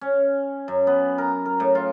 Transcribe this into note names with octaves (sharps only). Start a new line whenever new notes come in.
C#4
F#2
B3
A#4
A#4
A2
F4